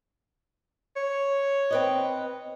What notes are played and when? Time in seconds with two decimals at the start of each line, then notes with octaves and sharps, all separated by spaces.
0.96 C#5
1.71 C4 B4 D#5